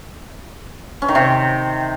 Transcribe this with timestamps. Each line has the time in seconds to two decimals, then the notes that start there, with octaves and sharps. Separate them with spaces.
1.02 C#4
1.08 D#3
1.15 C3